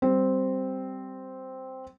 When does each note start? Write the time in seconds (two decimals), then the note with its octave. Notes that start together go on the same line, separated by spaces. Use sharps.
0.02 G3 C4